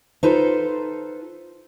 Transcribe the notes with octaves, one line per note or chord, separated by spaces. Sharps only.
D#4 F4 A4 B4 C5